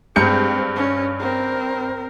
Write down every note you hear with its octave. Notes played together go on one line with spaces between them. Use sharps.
G2 G#3 C4 G6 C#7
C#4
C4 A#4